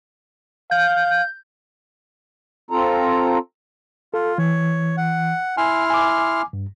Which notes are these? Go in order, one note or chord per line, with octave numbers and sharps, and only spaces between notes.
F5 G6
C4 F4 A4 A#5
F4 A4
E3 C#5
F#5
E4 G#5 C6 F6
G#5 D6
G2